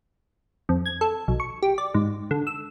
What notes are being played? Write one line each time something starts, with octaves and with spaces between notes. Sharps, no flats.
F2
G#6
A4
B1
C#6
G4
D5
G#2
D3
E6